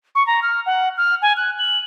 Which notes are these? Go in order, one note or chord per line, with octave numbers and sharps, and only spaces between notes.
C#6
A#5
F6
F#5
F6
G#5
F#6
F#7